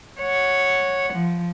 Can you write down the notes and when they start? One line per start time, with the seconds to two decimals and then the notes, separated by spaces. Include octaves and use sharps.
0.21 C#5 F#5
1.14 F3